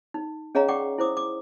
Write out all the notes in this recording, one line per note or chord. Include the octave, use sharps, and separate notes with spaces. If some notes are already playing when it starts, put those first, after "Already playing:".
D#4
C#4 G#4 C#5 D#5 F5 A#5
D5 F#5 G5 C#6 D6
E4 C5 D6 D#6
D6